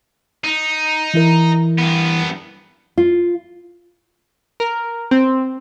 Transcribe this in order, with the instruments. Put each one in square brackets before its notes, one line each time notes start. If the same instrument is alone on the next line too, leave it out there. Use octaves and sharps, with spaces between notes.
[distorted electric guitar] D#4
[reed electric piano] E3 E4 A#4
[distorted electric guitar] G2 B3
[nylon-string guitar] F4
[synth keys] A#4
C4